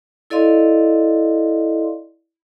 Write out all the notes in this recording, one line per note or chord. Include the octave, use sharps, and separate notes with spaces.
E4 A4 D5 D#5 F5 C6